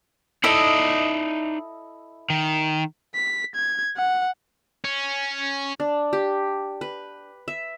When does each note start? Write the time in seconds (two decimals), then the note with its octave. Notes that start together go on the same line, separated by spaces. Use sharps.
0.44 D#4 E4 A4 D5 D#5
2.30 D#3
3.15 B6
3.55 G#6
3.97 F#5
4.84 C#4
5.80 D4
6.13 G4
6.81 B4
7.48 E5